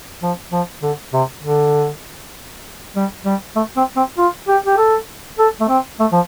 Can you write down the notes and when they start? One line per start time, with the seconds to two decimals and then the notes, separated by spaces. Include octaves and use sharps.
0.22 F3
0.52 F3
0.82 D3
1.13 C3
1.43 D3
2.96 G3
3.25 G3
3.56 A3
3.76 C4
3.96 C4
4.18 F4
4.48 G4
4.66 G4
4.77 A4
5.39 A4
5.60 A3
5.69 C4
6.00 A3
6.12 F3